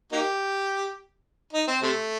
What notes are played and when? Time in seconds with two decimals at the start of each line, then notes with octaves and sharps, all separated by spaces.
0.12 A#3 D#4 G4
1.53 D#4
1.68 C4
1.82 C3 A3